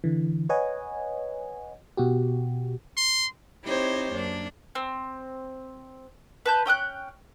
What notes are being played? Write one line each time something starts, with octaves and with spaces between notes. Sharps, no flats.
D3 E3
B4 C#5 D#5 F#5 G#5
B2 F#4 G4
C6
C4 D#4 E4 G4 C5 C#5
F#2 A#3 D4
C4
B4 A5 G6
C#4 G5 D#6 F#6